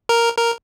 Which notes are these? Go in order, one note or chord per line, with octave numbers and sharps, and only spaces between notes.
A#4
A#4